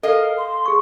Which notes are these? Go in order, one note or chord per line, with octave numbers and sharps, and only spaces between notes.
A4 A#4 D#5 F5
C6
G#4 C#6